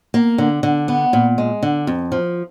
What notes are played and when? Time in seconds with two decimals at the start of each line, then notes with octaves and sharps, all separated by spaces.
0.14 A#3
0.38 D3
0.63 D3
0.88 B3
1.13 A#2
1.38 G#3
1.63 D3
1.87 F2
2.12 F3